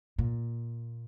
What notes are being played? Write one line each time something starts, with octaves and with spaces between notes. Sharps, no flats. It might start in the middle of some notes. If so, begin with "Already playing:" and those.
A#2